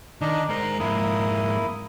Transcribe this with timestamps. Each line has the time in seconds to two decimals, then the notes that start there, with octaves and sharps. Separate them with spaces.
0.21 D#3 D4 D#4 D#5
0.49 G#3 A#4 C5
0.80 F2 G#2 A#3 E4 D#6